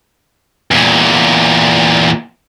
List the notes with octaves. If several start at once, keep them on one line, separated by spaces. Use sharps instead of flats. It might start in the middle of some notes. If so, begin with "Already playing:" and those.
E2 A#2